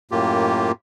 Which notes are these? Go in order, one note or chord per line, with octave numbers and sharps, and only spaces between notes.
F#2 A2 A#3 F4 G4